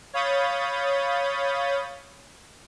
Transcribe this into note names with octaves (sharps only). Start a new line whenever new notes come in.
C#5 F5 B5 D#6 G6 A6